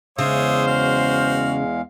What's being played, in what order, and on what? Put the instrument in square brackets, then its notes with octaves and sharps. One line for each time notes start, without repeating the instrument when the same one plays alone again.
[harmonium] E2 G#3 F5 [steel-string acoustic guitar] C#3 [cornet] C5 [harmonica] C#5 E5 D#6
[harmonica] F#4 F6